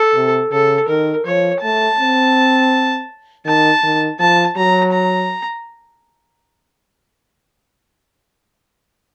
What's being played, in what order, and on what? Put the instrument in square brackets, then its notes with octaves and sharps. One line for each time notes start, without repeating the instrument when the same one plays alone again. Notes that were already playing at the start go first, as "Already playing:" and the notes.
Already playing: [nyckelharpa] A4
[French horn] C3
[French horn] C#3 [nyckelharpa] A4
[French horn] D#3 [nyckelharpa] A#4
[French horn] F3 [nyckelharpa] C#5
[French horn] A3 [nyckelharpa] A5
[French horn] C4
[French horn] D#3 [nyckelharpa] A5
[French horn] D#3
[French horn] F3 [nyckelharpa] A5
[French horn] F#3 [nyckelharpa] A#5
[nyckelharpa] A#5